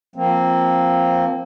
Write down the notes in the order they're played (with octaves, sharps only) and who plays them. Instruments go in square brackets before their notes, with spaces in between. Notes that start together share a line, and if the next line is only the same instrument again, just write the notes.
[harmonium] F3 A#3 C4